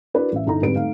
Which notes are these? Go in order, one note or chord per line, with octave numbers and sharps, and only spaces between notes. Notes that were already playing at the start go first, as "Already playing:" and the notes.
D4 E4 F#4 A#4 B4 D5
A1 E5
G1 D#4 E4 A4 A#5
F2 G#2 D3 G3 B4 D7
A3 D#4 F5